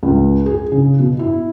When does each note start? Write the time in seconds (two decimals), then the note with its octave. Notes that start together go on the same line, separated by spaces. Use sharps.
0.03 C#2
0.46 G#4
0.72 C#3
0.99 B2
1.19 E4